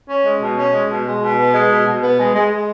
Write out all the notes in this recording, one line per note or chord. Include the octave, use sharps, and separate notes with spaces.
C#4
G#3
B2
C#4
G#3
B2
G#3
B2
B3
G#3
B2
B2
B3
G#3
G#3
G#3